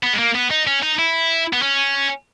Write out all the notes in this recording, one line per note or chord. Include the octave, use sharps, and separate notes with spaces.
B3
G#3
A#3
B3
D#4
C#4
D#4
E4
B3
C#4